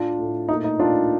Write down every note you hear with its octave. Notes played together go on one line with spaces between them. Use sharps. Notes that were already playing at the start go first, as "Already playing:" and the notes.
Already playing: A2 A3 D4 F4
A2 A3
A#2 A3 D#4
D#4
A#2 A3 D4 F4